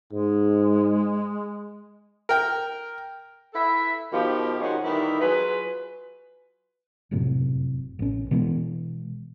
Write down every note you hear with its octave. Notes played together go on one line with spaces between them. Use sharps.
G#2 G#3
A#4 G5
E4 A4 B4 E5
B2 D#3 F3 F4 G4
D#3 G#3 C#4 D#4 F#4 C5
D#3 E3 G3 A3 D#4 E4
F#3 F4 G#4 B4
F1 F#2 A2 C3
A1 C#4
B2 E3 G#3